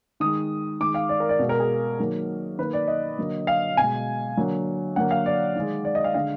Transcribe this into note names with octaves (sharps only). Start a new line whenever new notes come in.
D#3 G#3 D#6
D#3 G#3 D6
F5
D5
A#4
D5
B2 G#3
A#4
G#4
D#3 F#3 A#3
D#3 A#3 B4
D5
D#5
D3 F#3 A#3
F5
B2 G#3 G#5
D3 F#3 A#3
D3 F#3 A#3 F#5
F5
D5
D#3 G#3
D5
D#5
F5
D3 G#3 F5